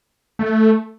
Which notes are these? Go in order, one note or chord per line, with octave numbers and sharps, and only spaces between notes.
A3